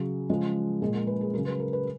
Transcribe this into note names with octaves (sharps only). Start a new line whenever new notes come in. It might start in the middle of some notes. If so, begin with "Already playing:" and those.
Already playing: C#3 F#3 G#4
C#3 F3 G#3
A#2 G#3 G#4
A#4
B4
G#4
C#3 F#3 A#4
B4
A#4
B4